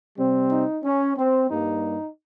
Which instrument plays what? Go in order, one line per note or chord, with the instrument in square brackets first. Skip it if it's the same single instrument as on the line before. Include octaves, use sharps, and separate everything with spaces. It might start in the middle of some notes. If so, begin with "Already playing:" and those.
[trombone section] C3 G3 C4
D#4
C#4
C4
G2 G3 A#3 D#4